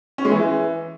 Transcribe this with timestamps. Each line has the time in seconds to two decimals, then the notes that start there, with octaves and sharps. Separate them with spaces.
0.18 C#4
0.25 G#3
0.31 E3